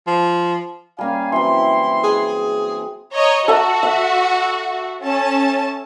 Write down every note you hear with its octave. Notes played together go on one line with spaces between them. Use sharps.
F3
G3 A#3 C#4 F5 G#5
E3 F#3 C4 E4 C6
G#4
C#5 D#5 A#5
F#4 A4 E5
E5
C#4 A5